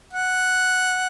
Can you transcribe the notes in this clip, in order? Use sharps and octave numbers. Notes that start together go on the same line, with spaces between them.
F#5